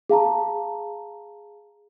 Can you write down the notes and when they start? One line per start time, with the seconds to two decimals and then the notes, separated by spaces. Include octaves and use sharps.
0.10 G#4 F5 A5 A#5